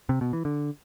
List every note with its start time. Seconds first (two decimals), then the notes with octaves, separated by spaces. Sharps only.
0.09 C3
0.21 B2
0.33 E3
0.45 D3